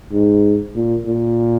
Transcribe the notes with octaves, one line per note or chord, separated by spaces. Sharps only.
G#2
A#2
A#2